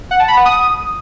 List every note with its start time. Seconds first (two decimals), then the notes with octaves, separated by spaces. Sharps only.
0.11 F#5
0.19 A5
0.28 B5
0.37 F#5
0.45 D#6